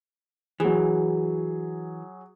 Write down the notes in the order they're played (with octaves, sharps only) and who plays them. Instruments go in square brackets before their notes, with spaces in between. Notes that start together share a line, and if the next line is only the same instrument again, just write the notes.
[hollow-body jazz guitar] E3 [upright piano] F#3 G#4